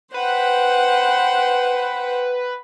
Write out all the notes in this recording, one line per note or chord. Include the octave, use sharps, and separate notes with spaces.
B4 C5 F#5 G5